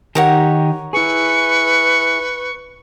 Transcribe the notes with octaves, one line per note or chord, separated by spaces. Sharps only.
D#3 D#4 G4 A#4 C#5 F#5
E4 G#4 B4 C#6